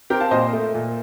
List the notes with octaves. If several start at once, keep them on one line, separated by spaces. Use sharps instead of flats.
C4 G4 A#4
F5 A5
A#2 C5 D#5
A3
A#2